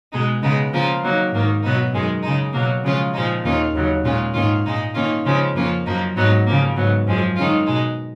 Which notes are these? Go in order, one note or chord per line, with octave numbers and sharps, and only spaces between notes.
B2 G#3 B3 D#4
C#3 G#3 B3 D#4
C#3 F3 A#3 F4
D#3 F#3 A#3
G#2 D#3 A#3
B2 F#3 B3 D#4
F#2 D#3 G#3
C#3 G#3 D#4
B2 F#3 A#3
C#3 F3 G#3 C#4 F4
A#2 F3 G#3 D#4
D#2 D#3 A#3 C#4 F4
D#2 C#3 F#3
A#2 G#3 C#4 F4
G#2 D#3 A#3 C#4 F4
A#2 G#3 D#4
D#3 A#3 C#4 F4
C#3 F3 G#3 C#4
F2 F3 A#3 C#4 F4
F#2 F3 A#3 D#4
G#2 F#3 B3 D#4
C#3 F3 A#3
G#2 F#3 B3
F#2 F3 G#3
D#3 G#3 C#4 F4
B2 G#3 D#4